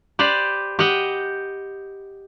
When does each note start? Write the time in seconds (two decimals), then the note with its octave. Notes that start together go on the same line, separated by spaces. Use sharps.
0.19 G4 B4 C5 D5
0.79 G4 D#5 F#5 G5